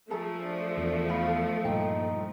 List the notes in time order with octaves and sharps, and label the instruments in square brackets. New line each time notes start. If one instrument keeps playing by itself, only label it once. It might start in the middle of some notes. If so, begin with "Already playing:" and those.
[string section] F3 A3 [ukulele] G#4 A4 A#5
[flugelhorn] D4
[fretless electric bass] E2 [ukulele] D5
[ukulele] D#4 F4 B5 [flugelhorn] F5
[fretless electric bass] G2 A#2 [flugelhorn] D#4 [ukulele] G5